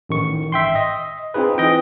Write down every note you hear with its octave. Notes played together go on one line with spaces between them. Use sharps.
A1 D#3 C#6
G#1 E5 G5 C6
D#5
C4 D#4 F4 G#4 B4
E3 D#5 G5